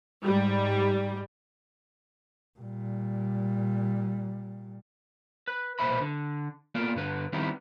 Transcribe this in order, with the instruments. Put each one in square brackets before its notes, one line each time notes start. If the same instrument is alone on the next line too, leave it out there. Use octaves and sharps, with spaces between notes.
[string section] G#2 G3
[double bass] A#2 G3
[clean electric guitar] B4
B1 A#2 B4 C5 E5 B5
D3
A#3 B3 F4 A4 D5
G2 D3 B4
D#3 G3 B3 C4 D#4 E4